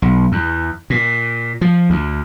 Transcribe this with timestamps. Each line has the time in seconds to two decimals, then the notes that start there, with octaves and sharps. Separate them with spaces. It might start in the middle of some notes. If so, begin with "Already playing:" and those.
0.02 B1
0.32 E2
0.90 A#2
1.61 F3
1.90 D2